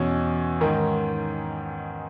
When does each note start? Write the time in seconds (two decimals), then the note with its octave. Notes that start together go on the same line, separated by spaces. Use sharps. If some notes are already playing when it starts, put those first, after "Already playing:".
Already playing: E2 B2 C#4
0.61 G#2 D#3